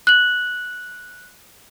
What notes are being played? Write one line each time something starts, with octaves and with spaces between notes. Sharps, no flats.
F#6 F#7